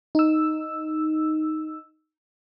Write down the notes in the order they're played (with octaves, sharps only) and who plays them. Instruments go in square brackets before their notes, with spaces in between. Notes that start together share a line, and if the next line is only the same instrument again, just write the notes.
[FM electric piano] D#4 E6